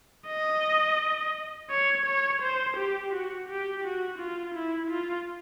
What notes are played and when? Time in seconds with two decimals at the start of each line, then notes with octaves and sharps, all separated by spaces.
0.28 D#5
1.70 C#5
2.06 C#5
2.42 C5
2.77 G4
3.13 F#4
3.49 G4
3.84 F#4
4.19 F4
4.55 E4
4.91 F4